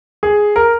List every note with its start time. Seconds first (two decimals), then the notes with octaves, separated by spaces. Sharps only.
0.23 G#4
0.56 A#4